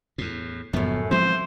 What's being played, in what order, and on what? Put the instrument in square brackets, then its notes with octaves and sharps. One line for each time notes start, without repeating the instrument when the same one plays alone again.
[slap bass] E2 A2
[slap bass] F#1 F3 B3 [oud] F#2 A2
[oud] E3 [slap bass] F3 G#3 C4 [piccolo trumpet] C5